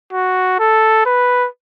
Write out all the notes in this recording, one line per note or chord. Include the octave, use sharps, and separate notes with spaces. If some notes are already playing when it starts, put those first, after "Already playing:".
F#4
A4
B4